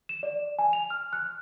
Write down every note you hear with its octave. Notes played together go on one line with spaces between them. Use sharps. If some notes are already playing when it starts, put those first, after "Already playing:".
E7
D5
G#5
F7
F6
F#6